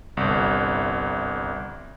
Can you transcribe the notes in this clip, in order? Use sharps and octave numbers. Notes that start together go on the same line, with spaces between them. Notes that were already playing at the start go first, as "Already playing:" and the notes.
G1 C2